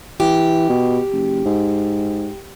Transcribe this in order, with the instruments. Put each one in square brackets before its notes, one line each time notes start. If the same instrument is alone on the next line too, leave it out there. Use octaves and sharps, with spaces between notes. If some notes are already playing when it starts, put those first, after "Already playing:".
[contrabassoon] E3 [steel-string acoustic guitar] G4
[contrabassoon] B2
F#1
G#2